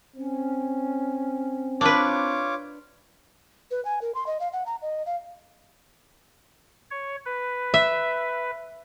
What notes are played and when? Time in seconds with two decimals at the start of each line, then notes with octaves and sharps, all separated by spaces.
0.16 C4 C#4
1.81 D4 F4 B4 C#5 D6
3.71 B4
3.85 G#5
4.02 A#4
4.15 C6
4.27 D#5
4.40 F5
4.53 F#5
4.66 A#5
4.82 D#5
5.06 F5
6.91 C#5
7.26 B4
7.74 E5